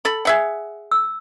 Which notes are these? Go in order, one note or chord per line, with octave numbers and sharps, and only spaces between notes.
A4 B5
G#4 E5 F#5
E6